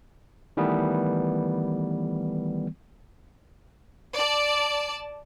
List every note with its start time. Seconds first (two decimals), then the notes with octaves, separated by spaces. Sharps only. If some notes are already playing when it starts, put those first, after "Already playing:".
0.57 D#3 E3 G3 A3 B3
4.15 D5 A5